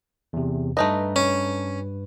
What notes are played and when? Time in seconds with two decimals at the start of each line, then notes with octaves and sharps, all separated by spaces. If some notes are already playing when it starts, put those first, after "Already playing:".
0.33 E2 C3
0.77 G2 A3 D#4 B4 D#5
1.16 C#4